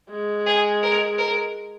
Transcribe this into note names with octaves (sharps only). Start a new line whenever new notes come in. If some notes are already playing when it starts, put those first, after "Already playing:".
G#3
G#4
A#4
A#4